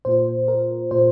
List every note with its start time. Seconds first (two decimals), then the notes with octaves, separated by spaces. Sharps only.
0.05 A#2 A#3 F4 C5
0.48 A#4
0.91 A#2 A#3 F4 C5